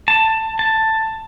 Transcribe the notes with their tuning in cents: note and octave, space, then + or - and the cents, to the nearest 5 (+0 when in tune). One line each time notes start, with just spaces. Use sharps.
A5 +15
A5 +10